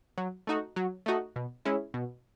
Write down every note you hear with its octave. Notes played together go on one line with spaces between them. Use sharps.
F#3
A3 D#4 F#4
F#3
A3 D#4 F#4
B2
G#3 C#4 E4
B2